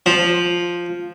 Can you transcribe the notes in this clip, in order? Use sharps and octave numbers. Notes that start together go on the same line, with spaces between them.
F3